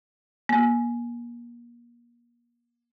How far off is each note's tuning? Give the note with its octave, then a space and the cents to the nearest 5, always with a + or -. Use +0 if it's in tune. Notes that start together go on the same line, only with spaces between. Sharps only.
A#3 +35